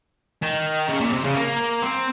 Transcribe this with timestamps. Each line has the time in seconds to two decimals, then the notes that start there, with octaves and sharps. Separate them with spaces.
0.42 D#3
0.89 C#3
1.01 A#2
1.13 C3
1.24 C#3
1.36 A#3
1.82 C4